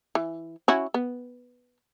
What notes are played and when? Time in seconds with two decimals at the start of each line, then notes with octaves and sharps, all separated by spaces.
0.15 E3
0.68 C#4 E4 F#4
0.94 B3